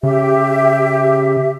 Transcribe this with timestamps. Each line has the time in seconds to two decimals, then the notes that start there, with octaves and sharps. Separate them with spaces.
0.03 C#3 G4 E5